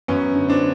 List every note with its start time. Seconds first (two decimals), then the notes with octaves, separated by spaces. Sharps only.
0.08 F#2 B3 C#4
0.35 D3
0.49 C4 D4